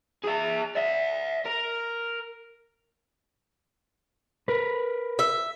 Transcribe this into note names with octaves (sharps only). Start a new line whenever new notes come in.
G#4 E5
D5 E5
A#4
A#4 B4
E5